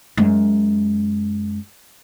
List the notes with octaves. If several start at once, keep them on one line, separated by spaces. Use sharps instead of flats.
F#2 G#3